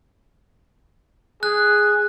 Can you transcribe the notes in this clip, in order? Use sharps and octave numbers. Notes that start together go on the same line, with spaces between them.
G#4 F#6